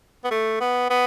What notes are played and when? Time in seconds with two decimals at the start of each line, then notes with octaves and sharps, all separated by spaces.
0.24 B3
0.31 A3
0.61 B3
0.90 B3